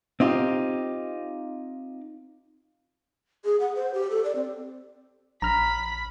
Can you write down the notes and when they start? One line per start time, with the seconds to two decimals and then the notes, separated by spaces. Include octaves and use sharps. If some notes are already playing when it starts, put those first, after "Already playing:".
0.20 C4 D#4 F4 G4
3.45 G#4
3.60 F#5
3.76 C5
3.94 G4
4.11 A4
4.24 D5
4.36 C4
5.42 A#1 A#5 B5 F6